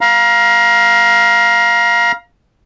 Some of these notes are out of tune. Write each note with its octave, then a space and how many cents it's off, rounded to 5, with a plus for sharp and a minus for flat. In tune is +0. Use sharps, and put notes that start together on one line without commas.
F5 +0 A#5 +30